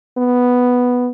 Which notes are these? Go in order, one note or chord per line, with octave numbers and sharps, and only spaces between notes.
B3